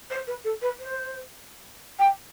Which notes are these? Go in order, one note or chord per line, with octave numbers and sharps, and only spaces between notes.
C5
B4
A4
B4
C5
G5